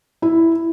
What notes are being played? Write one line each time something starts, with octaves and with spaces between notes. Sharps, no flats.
E4